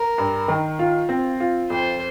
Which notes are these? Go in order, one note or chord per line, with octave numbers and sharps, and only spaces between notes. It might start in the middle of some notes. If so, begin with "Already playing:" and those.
Already playing: A#4
G2
D#3
F4
C4
F4
F2 C5